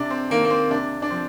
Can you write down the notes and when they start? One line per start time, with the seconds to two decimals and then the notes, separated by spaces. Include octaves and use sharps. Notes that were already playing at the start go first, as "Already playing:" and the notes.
Already playing: C3 D4
0.10 C4
0.30 D#3 A#3
0.45 A#3
0.50 C4
0.70 C3 D4
1.02 D4
1.10 F3 C4